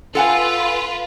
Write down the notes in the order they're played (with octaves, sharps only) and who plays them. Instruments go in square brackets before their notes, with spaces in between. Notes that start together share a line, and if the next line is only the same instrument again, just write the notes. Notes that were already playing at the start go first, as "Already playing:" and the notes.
[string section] F4 B4 [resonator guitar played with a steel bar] A4 F#5 G#5